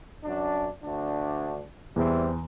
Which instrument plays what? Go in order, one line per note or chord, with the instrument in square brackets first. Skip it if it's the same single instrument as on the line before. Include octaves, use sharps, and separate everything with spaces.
[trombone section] F#2 D4
D2 D4
[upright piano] E2 [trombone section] E3 G3 C4